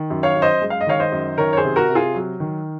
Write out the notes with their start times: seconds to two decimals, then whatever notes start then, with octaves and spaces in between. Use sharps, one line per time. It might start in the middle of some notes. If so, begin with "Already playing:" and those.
Already playing: D#3
0.10 F#2
0.23 C#5 F5
0.36 F#2
0.42 C5 D#5
0.62 G#3
0.70 F5
0.81 D#5
0.87 D#3 C#5 F5
1.00 C5 D#5
1.12 F#2
1.38 D#3 A#4 C#5
1.53 C#5
1.57 G#4 C5
1.64 C3
1.76 F#4 A#4
1.89 C3
1.95 F4 G#4
2.14 F#3
2.40 D#3